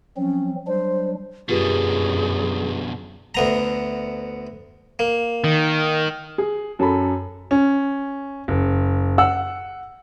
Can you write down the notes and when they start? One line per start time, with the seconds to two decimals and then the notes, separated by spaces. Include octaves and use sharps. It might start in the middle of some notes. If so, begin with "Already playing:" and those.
0.17 F3 F#3 C4 C#4
0.67 F#3 G3 D4 C5
1.49 F#2 B2 D3 F4 G4 G#4 B4
3.35 D2 B3 A#5
4.99 A#3
5.44 D#3
6.38 G#4
6.79 F#2 A4 B5
7.51 C#4
8.48 F#1
9.18 F#5 E6